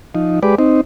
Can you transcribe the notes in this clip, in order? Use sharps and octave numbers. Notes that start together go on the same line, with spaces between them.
F3 D#4
G#3 G4 B4 D5
C4 D#4